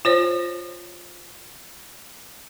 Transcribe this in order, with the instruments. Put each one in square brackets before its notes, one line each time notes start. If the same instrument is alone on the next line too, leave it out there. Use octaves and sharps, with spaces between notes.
[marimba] F4 C5 C#5